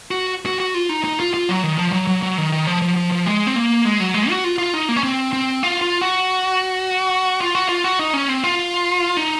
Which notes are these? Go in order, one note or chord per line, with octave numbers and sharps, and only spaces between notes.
F#4
F#4
F#4
F4
D#4
D#4
F4
F4
F#3
D#3
F3
F#3
F#3
F#3
D#3
D#3
F3
F3
F3
F3
G#3
C4
A#3
G#3
F#3
G#3
F#4
F4
F4
D#4
A#3
C#4
C4
C4
F4
F4
F#4
F4
F#4
F4
F#4
D#4
C#4
C4
F4
D#4